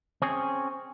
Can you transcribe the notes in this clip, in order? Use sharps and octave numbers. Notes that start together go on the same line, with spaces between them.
C4 C#4 G#4